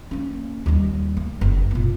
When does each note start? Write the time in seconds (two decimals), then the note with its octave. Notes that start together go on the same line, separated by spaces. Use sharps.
0.11 A#3 C#4
0.66 D#2 G3
1.17 A#3
1.41 F#1
1.71 A#2 B3